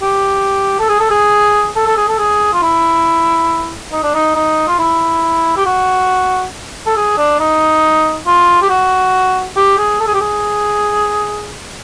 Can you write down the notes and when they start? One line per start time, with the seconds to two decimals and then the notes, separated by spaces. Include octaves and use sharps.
0.02 G4
0.80 A4
0.89 G#4
1.00 A4
1.11 G#4
1.76 A4
1.87 A4
1.97 G#4
2.08 A4
2.18 G#4
2.53 F4
2.62 E4
3.92 D#4
4.03 D4
4.15 D#4
4.36 D#4
4.68 F4
4.79 E4
5.57 G4
5.66 F#4
6.87 A4
6.97 G#4
7.18 D4
7.40 D#4
8.27 F4
8.62 G4
8.69 F#4
9.57 G4
9.78 G#4
10.00 A4
10.07 G#4
10.14 G4
10.21 G#4